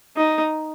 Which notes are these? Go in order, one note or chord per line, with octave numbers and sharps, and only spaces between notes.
D#4